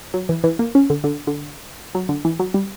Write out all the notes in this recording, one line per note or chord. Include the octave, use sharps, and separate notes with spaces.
F#3
E3
E3
A#3
C#4
D3
D3
D3
F#3
D3
E3
F#3
G3